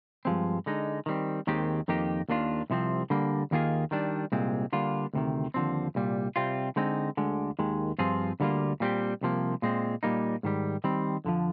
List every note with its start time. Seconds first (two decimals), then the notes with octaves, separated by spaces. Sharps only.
0.25 G2 F3 G#3 C4
0.66 D3 G#3 D#4
1.06 D#3 G3 C4
1.47 D#2 D#3 G#3 C4 G4
1.88 F2 D#3 A#3 D#4 G4
2.28 D#2 D#3 A#3 D4 F4
2.70 C2 C3 F3 C4
3.10 D3 G3 A#3
3.51 D#2 D#3 A#3 F4 G#4
3.91 D#3 G3 D4
4.32 C2 A#2 G#3 C4
4.72 D3 G3 A#3 D4 F4
5.13 D2 C3 D#3
5.54 D#2 D3 F3 C4
5.95 C2 A#2 G3
6.36 C3 G3 C4 F4
6.76 D3 G#3 C4 D#4
7.17 D2 D3 G#3
7.59 D#2 D#3 G#3
7.98 G2 F3 C4 F4 G#4
8.40 D2 D3 G3 A#3 F4
8.80 A#2 G3 C4 G4
9.21 C2 C3 F3 A#3
9.62 A#2 G#3 C4
10.03 A#2 G3 A#3 D#4
10.43 G#2 D#3 G3
10.84 D#3 G3 C4
11.24 F2 D3 F3